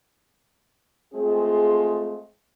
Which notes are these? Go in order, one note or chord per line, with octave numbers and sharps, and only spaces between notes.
G#3 A3 C4 F4 G#4